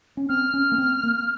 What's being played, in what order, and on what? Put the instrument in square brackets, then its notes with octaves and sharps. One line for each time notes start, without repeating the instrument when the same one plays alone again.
[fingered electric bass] C#4
[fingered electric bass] C4 [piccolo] F6
[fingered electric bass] C#4
A#3
C4
A#3